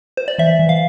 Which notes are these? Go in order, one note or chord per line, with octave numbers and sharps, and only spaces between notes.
C5
D5
E3 E5
E3
F5